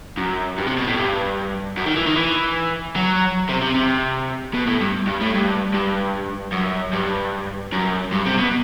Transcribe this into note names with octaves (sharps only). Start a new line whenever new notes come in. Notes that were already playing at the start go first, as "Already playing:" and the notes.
F#2
G2
C3
B2
A2
G2
F#2
D#3
E3
D#3
E3
F#3
C3
C3
C3
B2
A2
G2
G2
A2
G2
G2
F#2
G2
F#2
G2
C3
B2